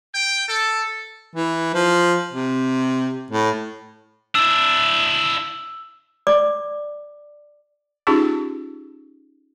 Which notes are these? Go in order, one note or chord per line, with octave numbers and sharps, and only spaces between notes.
G5
A4
E3
F3
C3
A2
D4 E4 E6
D5 D6
C#4 D#4 F4 G4 G#4